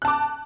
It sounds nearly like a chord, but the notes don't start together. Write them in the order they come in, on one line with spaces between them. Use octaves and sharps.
F#6 A5 D6